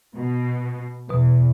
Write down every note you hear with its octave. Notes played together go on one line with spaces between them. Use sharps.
B2
E2 B2 B4